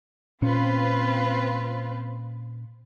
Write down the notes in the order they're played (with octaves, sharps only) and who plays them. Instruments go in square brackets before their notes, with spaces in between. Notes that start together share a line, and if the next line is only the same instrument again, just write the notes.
[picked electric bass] A#2 C#4 [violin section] C4 F4 B4